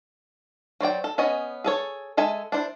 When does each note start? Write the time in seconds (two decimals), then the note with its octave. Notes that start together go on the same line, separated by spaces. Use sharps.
0.80 F#3 C5 D5 G5
1.04 A4
1.18 B3 C#4 D#5 G#5
1.64 G#4 A4 C#5
2.17 G#3 A4 E5 G#5
2.52 D4 E4 C5